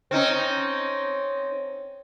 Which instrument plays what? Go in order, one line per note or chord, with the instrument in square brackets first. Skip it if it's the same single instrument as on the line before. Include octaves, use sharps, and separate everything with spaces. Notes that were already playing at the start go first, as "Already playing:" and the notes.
[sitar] C4 C#4 D#4